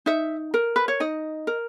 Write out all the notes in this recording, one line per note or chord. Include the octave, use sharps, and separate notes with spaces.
D#4 E5
A#4
B4
C#5
D#4 D#5
A#4